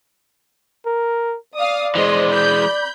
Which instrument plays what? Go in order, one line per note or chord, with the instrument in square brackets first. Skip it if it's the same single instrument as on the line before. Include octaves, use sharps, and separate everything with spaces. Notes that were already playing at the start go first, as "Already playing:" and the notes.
[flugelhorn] A#4
[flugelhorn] D5 [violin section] F5 D#6
[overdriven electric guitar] E3 G#3 [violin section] C5 D#5 C6
[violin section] B5 G6